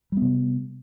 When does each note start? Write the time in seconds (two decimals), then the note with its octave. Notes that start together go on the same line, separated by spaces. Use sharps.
0.12 G3
0.17 B3
0.22 C3